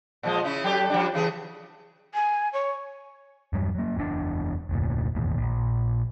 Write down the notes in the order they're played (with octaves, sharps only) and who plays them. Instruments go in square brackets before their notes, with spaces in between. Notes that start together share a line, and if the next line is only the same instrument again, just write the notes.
[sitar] A#2 F3 G#3
C#3 C#4 E4
F#3 G4 A4
F3 G3 D4
C#3 E3 G#4
[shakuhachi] G#5
C#5
[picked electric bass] E2 G2 G3
F#3 A#3
F#1 E2 G#2 D4
F1 D2 A#2
E1 A1 D#2
A#1